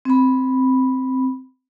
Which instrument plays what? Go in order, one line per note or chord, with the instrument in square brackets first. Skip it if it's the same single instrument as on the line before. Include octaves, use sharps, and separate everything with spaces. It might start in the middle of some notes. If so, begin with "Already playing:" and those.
[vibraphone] C4 B5